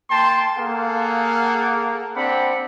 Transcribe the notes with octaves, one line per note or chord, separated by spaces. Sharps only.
A#3 G5 A5 C6
A#3 G#4 A4 F5 F#5
C4 D4 F#5 B5